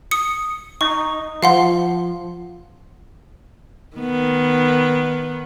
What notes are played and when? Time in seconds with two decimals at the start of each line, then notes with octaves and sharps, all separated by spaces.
0.11 D#6 C#7
0.81 D#4 C#6
1.43 F3 F5 F#5 C6
3.97 D#3 B3